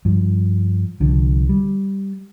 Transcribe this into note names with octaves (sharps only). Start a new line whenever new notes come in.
G2 F3
C2 D3 F3
G3